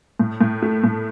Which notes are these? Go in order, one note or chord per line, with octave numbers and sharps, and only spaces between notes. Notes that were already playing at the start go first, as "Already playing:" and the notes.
A2
A2
A3
A2